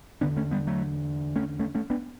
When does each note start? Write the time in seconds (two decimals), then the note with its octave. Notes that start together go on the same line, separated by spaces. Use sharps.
0.21 E2 D3 B3 D4
0.37 A3 C#4
0.51 G3 B3
0.67 F#3 A3
1.36 A3 C#4
1.60 A3 C#4
1.75 A3 C#4
1.90 B3 D4